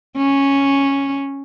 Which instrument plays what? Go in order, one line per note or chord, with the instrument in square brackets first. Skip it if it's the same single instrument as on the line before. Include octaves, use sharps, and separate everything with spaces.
[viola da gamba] C#4